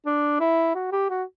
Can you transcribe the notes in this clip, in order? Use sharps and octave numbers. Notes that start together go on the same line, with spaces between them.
D4
E4
F#4
G4
F#4